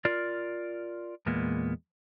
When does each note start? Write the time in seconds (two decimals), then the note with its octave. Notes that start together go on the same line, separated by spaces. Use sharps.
0.05 F4 A#4 D5
1.26 E2 A#2 G#3 A#3 B3